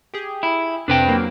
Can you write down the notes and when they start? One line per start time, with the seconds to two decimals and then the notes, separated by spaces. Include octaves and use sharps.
0.14 G4 G#4
0.43 E4
0.88 F2 C3 D4 B4 G5
1.09 F#3 A#3